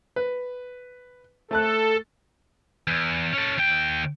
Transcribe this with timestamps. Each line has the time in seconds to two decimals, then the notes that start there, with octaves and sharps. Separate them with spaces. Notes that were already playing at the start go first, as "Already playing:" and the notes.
0.16 B4
1.51 A3 A4 A5 F#6
2.87 E2
3.33 C#4 A4
3.58 D#2 G5